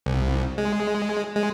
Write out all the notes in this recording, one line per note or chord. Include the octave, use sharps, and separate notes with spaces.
C2
G#3
G#3